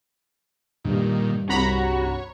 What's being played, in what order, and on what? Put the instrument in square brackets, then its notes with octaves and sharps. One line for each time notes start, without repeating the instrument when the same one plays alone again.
[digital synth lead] G2 [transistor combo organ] A#2 D#3
[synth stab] C2 A#5 B5 [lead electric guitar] F#4 [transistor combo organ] C#5